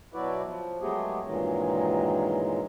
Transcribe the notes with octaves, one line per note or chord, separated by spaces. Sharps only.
B2 F#3 E4 F#4 B4 D5
F3
F#3 G#3 A3 B3 G4 G#4
G2 A#2 D#3 E3 F#3 G#3